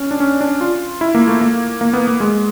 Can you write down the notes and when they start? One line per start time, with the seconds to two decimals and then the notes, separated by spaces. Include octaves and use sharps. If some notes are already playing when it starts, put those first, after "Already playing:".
Already playing: C#4
0.11 D4
0.20 C#4
0.41 D4
0.61 F4
1.01 E4
1.15 A#3
1.27 A3
1.41 A#3
1.81 A#3
1.93 B3
2.07 A#3
2.20 G#3